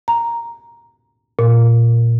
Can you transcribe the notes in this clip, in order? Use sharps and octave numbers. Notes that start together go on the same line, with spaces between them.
A#5
A#2